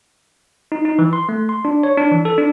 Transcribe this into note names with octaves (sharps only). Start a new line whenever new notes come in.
D#4
D#4
E3
C6
A3
C6
D4
C#5
D4
E3
A4
D4